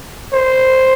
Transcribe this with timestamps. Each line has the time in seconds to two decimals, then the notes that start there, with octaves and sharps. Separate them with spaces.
0.33 C5